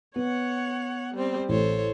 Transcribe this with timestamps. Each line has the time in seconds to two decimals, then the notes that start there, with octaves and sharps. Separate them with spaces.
0.16 B3 C#5 F#5
1.14 G3 C4 C5
1.49 A1 A4 C5 C#5